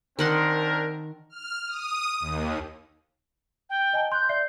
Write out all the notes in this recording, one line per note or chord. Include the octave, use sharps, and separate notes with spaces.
D#3 C4 D4 A#4 F#5 C6
F6
D#6
D#2
G5
D#5 G#5 A5
C6 F#6 G6
D5 E5 C7